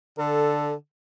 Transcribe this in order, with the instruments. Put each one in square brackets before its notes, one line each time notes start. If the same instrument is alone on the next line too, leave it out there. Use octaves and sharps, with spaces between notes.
[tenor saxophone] D3 [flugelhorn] A4